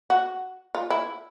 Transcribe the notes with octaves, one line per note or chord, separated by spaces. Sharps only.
F#4
F4
E4